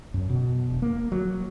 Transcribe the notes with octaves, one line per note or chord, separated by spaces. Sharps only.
F#2
B2
E1
A#3
F#3